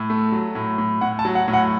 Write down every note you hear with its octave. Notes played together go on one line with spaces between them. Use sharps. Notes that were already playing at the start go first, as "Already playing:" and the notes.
Already playing: A2
A3
F#3
A2
A2
A2 F#5
A5
F#3
F#5
A2
F#5